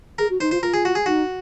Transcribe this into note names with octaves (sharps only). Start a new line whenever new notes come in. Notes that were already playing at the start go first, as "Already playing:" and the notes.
G#4 A#4
F#4
D#4 C5
F4 C5
F4 A#4
G#4
F#4
G#4
D#4 F#4